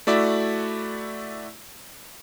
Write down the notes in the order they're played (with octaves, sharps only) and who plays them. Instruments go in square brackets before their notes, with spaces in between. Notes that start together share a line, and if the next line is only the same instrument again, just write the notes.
[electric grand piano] A3 E4 F#4 D5 E5